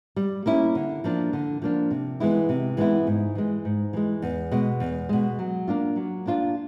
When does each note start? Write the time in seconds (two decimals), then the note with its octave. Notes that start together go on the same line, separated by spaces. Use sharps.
0.16 G3
0.46 A#3 C#4 E4
0.75 D3
1.04 F3 A#3 D4
1.33 D3
1.62 F3 A#3 D4
1.91 C3
2.20 E3 G#3 B3 E4
2.49 C3
2.77 E3 G#3 B3 E4
3.07 G#2
3.35 E3 G#3
3.65 G#2
3.93 E3 G#3
4.22 E2
4.52 B2 G#3
4.80 E2
5.09 B2 G#3
5.39 F#3
5.68 A#3 D4 F4
5.96 F#3
6.26 A#3 D4 F4